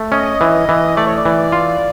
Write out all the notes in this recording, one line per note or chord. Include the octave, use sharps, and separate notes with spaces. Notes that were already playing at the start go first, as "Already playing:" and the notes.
Already playing: A3
C#4 D#5
E3
E3
A3 D5
C#5
D5
E3
F4